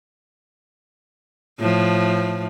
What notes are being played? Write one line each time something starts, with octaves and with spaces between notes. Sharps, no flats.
A2 F3